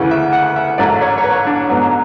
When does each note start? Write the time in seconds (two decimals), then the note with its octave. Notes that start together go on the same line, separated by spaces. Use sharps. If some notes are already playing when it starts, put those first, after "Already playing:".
Already playing: D2 C#3 E3
0.11 E5
0.33 F#5
0.56 E5
0.78 A1 G#2 F#3 D5
1.02 C#5
1.18 C#5
1.24 B4
1.47 D4
1.69 A1 G#2 F#3 B3